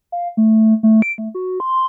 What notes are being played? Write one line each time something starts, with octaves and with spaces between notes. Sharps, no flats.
F5
A3
A3
D7
A3
F#4
C6